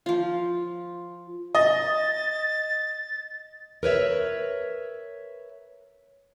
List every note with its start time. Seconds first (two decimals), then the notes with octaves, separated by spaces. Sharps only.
0.06 F3 F4
1.55 D#5 A6
3.83 A#4 B4 C#5 E5